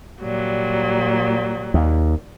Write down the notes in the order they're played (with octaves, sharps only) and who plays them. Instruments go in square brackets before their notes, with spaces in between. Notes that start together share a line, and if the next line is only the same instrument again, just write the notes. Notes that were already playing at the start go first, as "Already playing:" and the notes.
[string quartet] A#2 F#3 G3
[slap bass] D#2